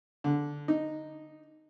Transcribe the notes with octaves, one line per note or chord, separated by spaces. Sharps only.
D3
D#4